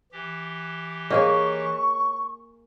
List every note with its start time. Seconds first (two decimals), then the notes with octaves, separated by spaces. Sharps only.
0.12 E3 G4
1.10 A#3 G#4 C#5 D#5 C#6